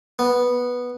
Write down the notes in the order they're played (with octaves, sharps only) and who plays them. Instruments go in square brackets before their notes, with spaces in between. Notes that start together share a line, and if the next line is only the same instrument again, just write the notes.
[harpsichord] B3